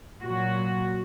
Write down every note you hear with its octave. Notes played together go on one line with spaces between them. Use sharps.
A#2 F#3 F#4